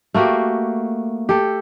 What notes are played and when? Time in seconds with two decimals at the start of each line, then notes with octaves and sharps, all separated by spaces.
0.14 A3 A#3 F#4 G4
1.29 G4 A4